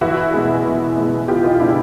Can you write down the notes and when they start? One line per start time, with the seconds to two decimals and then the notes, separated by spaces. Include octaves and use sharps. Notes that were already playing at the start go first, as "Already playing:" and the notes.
0.01 E2 E4 F#4
0.33 B2 G#3
0.64 E2
0.97 B2 G#3
1.28 E2 F4 G4
1.44 D#4 F4
1.55 F4
1.60 B2 G#3 D4 E4